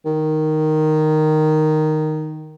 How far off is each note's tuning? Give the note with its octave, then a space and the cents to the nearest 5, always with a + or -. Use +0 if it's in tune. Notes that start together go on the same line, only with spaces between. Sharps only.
D#3 -5